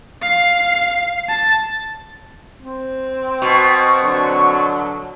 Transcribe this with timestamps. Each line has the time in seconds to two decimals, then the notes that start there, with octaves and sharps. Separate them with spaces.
0.22 F5 C7
1.29 A5
2.59 C4
3.42 B2 C#6
4.03 D3 F#3